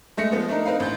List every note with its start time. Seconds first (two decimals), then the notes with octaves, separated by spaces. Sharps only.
0.17 G#3 A3 A#6 C#7
0.32 F3 G#3 B3
0.49 A3 D4 D#4 A#4
0.65 C4 D#4 A#4 B4 F5
0.80 A1 G6